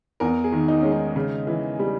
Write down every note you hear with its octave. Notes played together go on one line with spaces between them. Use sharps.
E2 A#4
G#4
D#3
D#4
G#3 C#4
D#4
C#3
E3
G3